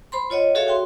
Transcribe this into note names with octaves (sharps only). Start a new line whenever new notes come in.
C5 B5 C6
F4 C#5 D#5 F#5
F#4 G#4 A4 C#5 E5 F5
F#4 G5 C6